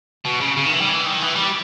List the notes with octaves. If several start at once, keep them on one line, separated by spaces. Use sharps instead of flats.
B2
C#3
C#3
D#3
E3
G3
E3
D#3
E3
G3